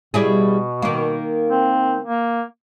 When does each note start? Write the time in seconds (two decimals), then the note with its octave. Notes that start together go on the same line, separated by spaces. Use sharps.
0.14 B2 G3 E4 G#4
0.82 D#3 A#3
1.49 C4
2.05 A#3